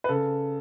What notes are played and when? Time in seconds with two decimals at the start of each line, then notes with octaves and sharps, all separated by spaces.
0.04 B4
0.09 C#3 A4